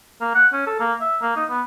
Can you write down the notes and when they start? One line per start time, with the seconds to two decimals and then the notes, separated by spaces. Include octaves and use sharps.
0.21 A#3
0.35 F#5
0.53 C#4
0.67 A4
0.80 A#3
1.01 E5
1.22 A#3
1.36 D#4
1.50 B3